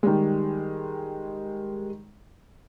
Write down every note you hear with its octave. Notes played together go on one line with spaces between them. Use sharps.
D#3 G3 G#3